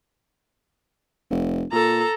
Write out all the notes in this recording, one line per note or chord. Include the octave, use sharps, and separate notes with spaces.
F1
A#2 A4 A#5